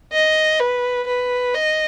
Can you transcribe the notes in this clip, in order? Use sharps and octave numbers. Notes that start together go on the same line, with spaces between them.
D#5
B4
B4
D#5